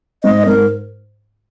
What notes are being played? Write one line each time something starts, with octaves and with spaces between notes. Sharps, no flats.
G#2 D#5
G#2 A#4